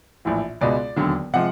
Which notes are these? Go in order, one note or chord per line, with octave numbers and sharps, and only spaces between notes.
A#1 A2 E3
C#2 B2 G#3 D5
E1 D#2 D3 F#3
C3 F3 G#3 F#5